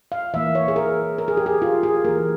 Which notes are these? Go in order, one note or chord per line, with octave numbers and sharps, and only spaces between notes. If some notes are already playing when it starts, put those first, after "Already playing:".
F5
E3 A#3 E5
C#5
G#4
A#4
A#4
G#4
G4
G#4
F4
G#4
E3 A#3 A#4